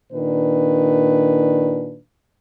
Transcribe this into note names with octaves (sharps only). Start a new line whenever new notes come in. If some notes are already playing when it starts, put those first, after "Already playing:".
A#2 D#3 D4 B4